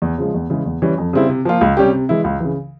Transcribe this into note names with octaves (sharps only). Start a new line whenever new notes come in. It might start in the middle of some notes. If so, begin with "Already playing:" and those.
E2
C#3 F3 G#3
E2
C#3 E3 G#3
E2
E3 G3 C#4
F2
C#3 G3 C4 E4
C3
F3 A#3 F4
C#2
C3 G3 C#4 G4
C3
E3 G#3 E4
C#2
C#3 E3